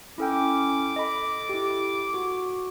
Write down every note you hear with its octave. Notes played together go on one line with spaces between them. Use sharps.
C#4 E4 A4 G5 D6
A4 D#5 B5
E4 G4
F#4